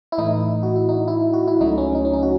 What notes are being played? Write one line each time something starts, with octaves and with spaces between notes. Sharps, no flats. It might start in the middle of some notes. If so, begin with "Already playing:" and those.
E4
A2 E3 A3 D#4
F#4
E4
D#4
E4
F#4
E4
C#2 C#3 F#3 A3 D#4
C#4
D#4
C#4
D#4
F#4